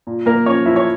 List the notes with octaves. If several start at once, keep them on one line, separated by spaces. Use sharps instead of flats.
A#2
A#2 A#3 A#4
F3 C#4 C#5
F3 E4 E5
C#5